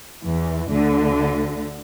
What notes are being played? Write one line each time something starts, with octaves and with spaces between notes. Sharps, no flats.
E2 E3
D2 D3